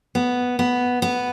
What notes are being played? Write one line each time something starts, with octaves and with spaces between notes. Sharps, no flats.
B3
B3
B3